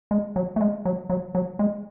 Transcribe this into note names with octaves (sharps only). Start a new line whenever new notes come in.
G#3
F#3
A3
G#3
F#3
F#3
F#3
G#3